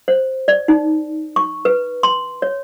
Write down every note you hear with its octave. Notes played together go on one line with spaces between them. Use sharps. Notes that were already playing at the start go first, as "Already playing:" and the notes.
C5
D5
D#4
C#6
B4
C6
C#5